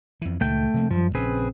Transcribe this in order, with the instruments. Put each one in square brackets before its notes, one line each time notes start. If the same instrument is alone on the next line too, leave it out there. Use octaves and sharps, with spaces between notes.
[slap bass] F2 E3
[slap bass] C#2 A#2 D#3 [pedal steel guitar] A3 G5
[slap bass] C3 F3 A#3
[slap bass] F#2 G3 [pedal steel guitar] F3
[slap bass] A#1 C#3 C#4 [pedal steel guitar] C4 G#4 B4